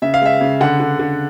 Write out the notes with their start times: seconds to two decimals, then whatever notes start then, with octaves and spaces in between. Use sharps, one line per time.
0.02 C#3 E5
0.14 F5
0.22 G#3 E5
0.41 C#3
0.61 D3 F#5
0.80 D3
0.99 D3